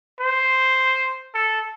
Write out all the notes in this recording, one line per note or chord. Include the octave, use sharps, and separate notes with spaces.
C5
A4